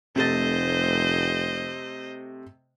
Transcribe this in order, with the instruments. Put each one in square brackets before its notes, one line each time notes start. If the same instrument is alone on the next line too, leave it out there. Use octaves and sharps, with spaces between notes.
[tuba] F1 [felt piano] C3 A3 A6 [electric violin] C5 D#5